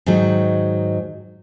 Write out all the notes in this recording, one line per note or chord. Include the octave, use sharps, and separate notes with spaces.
G#2 D#3 F#3